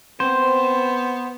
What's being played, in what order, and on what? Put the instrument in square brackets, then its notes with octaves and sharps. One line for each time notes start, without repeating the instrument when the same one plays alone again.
[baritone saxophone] B3 [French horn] C4 [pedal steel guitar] C5